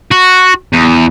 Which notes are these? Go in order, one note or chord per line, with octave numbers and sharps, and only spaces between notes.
F#4
E2